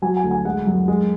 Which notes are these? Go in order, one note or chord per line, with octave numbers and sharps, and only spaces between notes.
F#3 G#5
G#5
D2
G#5
G#3 F#5
F#2
G#3